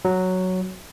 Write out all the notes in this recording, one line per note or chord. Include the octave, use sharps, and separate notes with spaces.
F#3